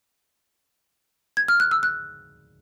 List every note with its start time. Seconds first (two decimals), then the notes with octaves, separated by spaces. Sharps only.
1.37 G#6
1.48 F6
1.60 F#6
1.71 E6
1.83 F#6